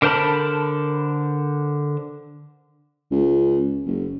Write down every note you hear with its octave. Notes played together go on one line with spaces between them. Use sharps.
D3 A#4 C5 A5 B5
C#2
F#1